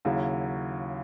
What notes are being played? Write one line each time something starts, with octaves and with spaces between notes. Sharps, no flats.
D#2 C#3 F#3 C#4 E4